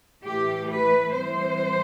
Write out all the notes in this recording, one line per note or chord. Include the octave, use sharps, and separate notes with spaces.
A2 E3 A3 G4
B4
A2 E3 G3 C4 C5